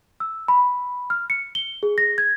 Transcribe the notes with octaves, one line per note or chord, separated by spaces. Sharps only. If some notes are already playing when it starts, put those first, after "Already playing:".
E6
B5
F6
C#7
G7
G#4
A#6
G#6